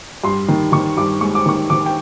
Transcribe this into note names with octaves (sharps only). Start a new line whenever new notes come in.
G2 C6
D#3
D#3 C#6
G2 D6
G#3 C#6
D6
D#3 C#6
D#3 D6
G5